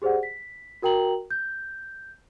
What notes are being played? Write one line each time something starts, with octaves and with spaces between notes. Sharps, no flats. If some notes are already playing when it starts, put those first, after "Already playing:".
G4 G#4 C5 D5 F#5
B6
F#4 A#4 G5 A#5 F#7
G6